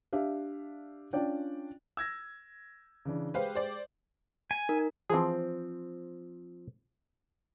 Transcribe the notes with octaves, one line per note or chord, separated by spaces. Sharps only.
D4 G4 E5 F5
C#4 D4 F4 D5 G5
E6 G#6 A#6
C#3 E3 D4
G#3 G4 B4 C5 F5
C5 D5
G#5
D#4 A#4
E3 F3 C4 G#4